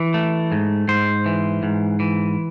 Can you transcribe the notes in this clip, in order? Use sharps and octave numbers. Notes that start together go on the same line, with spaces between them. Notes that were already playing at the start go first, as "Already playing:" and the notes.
Already playing: E3
A3
G#2
G#2 C5
E3
G#2
E3